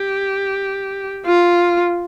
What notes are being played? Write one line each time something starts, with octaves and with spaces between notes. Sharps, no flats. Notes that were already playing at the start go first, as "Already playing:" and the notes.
Already playing: G4
F4